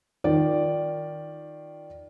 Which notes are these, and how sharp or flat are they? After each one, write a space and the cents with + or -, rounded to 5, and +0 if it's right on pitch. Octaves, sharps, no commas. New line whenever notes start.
D#3 +0 F4 +0 D5 +0